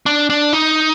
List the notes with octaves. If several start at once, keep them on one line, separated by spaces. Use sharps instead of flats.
D4
D4
D#4